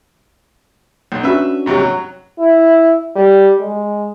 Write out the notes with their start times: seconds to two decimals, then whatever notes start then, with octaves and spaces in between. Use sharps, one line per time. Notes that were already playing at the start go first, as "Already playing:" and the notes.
1.12 B1
1.24 C#4 D4 F#4 B4 E5
1.66 G#2 C3 F#3
1.79 F#3
2.39 E4
3.16 G3
3.61 G#3